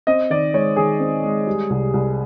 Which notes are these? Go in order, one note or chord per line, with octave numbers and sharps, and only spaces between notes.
C4 D#5
D#3 D5
G#3 C#5
D#3 G#4
C4
G#3
G3
C2
C2